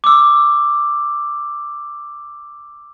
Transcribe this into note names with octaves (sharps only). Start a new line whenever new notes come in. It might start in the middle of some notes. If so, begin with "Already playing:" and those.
D6 E6